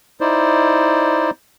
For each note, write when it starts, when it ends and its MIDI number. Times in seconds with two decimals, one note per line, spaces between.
0.21 1.30 63
0.21 1.30 64
0.21 1.30 72
0.21 1.30 74